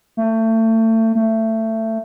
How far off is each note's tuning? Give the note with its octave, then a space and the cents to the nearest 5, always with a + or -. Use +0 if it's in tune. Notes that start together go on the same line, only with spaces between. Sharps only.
A3 +30
A3 +20